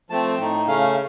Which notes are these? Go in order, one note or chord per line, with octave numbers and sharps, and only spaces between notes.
F3 A3 C4 A5
A2 A3 D#4
C#3 A3 C#4 F5